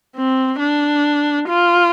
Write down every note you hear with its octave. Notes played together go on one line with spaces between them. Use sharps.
C4
D4
F4